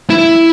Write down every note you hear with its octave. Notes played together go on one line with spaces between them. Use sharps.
E4